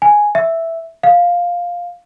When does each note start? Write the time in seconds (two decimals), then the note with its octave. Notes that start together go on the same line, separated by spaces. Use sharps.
0.02 G#5
0.35 E5
1.03 F5